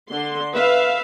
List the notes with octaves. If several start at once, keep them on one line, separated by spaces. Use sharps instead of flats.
D3 C6
B4 E5 F5